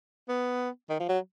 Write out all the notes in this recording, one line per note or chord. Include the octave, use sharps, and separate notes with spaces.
B3
D#3
F3
F#3